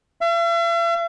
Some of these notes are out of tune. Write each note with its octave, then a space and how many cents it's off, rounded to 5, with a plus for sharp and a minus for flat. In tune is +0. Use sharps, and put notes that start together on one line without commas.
E5 +45